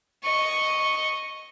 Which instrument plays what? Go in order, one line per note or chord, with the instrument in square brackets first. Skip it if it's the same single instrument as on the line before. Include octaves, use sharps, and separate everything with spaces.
[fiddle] D#5 C#6